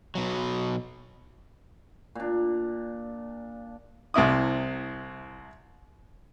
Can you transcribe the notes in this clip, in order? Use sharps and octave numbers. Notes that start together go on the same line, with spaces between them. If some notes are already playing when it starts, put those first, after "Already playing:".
B2 F#3
A#2 D4
C2 C3 E4 D#6